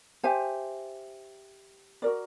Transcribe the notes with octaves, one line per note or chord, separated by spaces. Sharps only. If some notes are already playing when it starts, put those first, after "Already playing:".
G4 C5 E5 G#5
F#4 A#4 D5